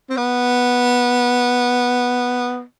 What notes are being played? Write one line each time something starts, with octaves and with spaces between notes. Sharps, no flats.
C4
B3